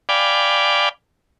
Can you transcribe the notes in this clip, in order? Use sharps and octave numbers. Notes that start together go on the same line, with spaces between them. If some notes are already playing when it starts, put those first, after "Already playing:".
D5 F5 G5 G#5 B5 D6